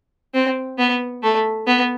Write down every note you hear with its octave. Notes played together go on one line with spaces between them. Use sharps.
C4
B3
A3
B3